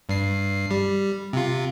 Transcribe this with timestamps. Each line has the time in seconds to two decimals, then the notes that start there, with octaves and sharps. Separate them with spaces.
0.09 G2 C7
0.71 G3
1.33 C3 F4